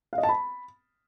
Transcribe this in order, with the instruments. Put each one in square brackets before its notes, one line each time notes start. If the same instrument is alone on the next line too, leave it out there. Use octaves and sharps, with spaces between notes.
[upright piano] F5
D#5
A5
B5